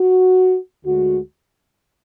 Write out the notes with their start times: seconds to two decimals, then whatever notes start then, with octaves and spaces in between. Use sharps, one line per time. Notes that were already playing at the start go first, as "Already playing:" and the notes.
Already playing: F#4
0.84 D2 D3 G#3 F#4